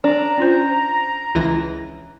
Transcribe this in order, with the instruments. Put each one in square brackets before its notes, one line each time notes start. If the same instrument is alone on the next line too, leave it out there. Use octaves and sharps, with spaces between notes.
[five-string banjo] D4 [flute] A#5
[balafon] C#4 F4 C5
[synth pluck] C#2 E3 A#6